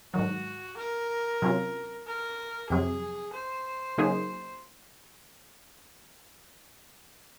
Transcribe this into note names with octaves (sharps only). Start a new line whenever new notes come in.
G#2 D#3 F#3 F#4
A#4
C3 F#3 C#4 F4
A#4
F2 C3 F#3 G#4
C5
C#3 F#3 A#3 D#4 G#4